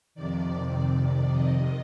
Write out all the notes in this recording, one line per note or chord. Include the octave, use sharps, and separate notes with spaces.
F2 C3 D#3 D5
D5
D#5